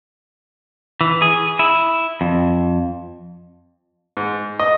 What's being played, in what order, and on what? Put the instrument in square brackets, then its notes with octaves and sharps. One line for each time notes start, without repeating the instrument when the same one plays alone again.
[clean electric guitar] E3
G#4
E4
F2
[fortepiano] G#2
D#5